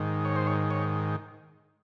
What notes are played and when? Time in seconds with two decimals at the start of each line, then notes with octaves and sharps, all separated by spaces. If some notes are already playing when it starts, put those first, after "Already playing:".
Already playing: G#2 D#3
0.25 C#5
0.36 C5
0.47 C#5
0.71 C#5